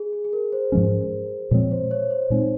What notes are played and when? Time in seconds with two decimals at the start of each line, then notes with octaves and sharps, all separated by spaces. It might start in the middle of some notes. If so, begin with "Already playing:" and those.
Already playing: G#4
0.13 G#4
0.24 G#4
0.33 A#4
0.52 C5
0.72 G#2 F3 G#3 C#4
1.51 A#2 F3 G#3 C4 C#5
1.71 C5
1.91 C#5
2.11 C5
2.30 A#2 G#3 C4 D#4
2.41 D#4